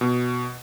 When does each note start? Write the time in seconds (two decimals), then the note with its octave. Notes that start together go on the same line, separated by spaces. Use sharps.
0.01 B2